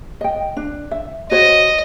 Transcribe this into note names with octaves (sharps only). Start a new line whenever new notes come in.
D#5 G5
D4
E5
F#4 C5 C#5 D#5